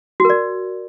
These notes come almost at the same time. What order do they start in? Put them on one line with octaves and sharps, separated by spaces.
F#4 A#4 D5